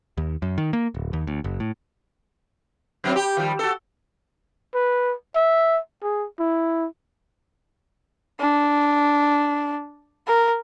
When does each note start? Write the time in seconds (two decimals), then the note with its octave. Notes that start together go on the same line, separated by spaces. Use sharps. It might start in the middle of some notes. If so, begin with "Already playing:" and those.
0.17 D#2
0.42 F#2
0.58 D#3
0.73 A#3
0.94 D1
1.13 D#2
1.27 D2
1.44 F#1
1.60 A2
3.04 F#2 F#3 C4
3.16 G4
3.37 D#3 F3 G3
3.59 F#4 A4
4.74 B4
5.36 E5
6.03 G#4
6.39 E4
8.40 D4
10.27 A#4